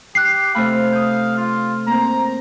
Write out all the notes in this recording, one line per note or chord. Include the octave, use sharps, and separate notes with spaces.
G4 F#6 C7
C3 A3 F5 B5
D#6 G6
F4
A#3 C4 A#5